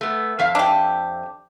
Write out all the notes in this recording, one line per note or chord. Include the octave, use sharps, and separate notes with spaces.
A3 B3
F2 E5 F5
D4 G4